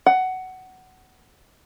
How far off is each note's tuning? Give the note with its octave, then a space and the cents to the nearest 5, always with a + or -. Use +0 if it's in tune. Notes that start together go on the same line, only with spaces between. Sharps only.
F#5 +15